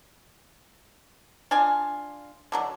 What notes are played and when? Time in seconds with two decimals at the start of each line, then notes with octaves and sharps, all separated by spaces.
1.51 D4 F4 G#5
2.52 D3 F#3 D4